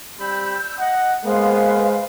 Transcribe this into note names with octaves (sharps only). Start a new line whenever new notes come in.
G3 C4 B5 E6 G6
D#5 F#5
G#3 A#3 B3 B4 C5 F5